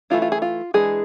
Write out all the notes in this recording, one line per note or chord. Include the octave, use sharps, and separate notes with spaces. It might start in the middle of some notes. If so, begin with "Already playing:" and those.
E3 A3 E4 F4
F4
G#4
F4
E3 G#3 D4 G#4